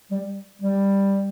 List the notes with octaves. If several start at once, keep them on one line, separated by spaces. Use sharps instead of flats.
G3
G3